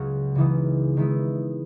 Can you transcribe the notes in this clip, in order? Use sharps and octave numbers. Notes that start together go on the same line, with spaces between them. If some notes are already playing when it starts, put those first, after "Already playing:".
Already playing: C#2 C#3 F#3 C#4 F#4
C#3 E3 B3 D#4
D#3 G#3 B3 E4